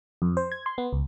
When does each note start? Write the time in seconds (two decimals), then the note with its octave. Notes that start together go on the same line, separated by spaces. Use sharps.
0.22 F2
0.37 C5
0.52 G#6
0.66 C6
0.78 B3
0.93 C#2